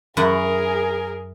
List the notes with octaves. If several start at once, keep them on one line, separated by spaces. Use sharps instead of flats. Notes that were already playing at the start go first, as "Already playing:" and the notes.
F#2 E4 G#4 A#4 F#5